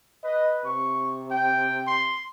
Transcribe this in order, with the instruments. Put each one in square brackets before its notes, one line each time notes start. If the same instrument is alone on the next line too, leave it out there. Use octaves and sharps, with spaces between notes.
[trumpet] B4 [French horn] D#5
[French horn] C3 [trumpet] C#6
[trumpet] G5
C6